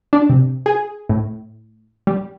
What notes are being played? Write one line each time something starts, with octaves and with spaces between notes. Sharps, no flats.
D4
C3
G#4
A2
G3